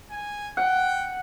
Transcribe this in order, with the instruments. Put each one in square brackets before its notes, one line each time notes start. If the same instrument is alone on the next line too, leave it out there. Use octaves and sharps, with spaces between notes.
[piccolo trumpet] G#5
[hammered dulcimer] F#5 [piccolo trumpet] G5